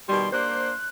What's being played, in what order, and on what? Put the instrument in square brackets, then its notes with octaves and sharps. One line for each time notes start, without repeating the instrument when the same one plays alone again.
[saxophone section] B2 D#3 G3 [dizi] C6
[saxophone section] A#3 D4 C5 [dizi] F#6